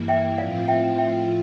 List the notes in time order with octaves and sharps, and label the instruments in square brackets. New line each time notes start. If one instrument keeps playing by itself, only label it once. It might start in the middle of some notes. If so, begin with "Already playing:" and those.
Already playing: [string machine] G2 E3 A#3 E4
[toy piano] E5 G5
[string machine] A2 F3 C4 F4 [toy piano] D5 F5
[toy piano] E5 G5
E5 G5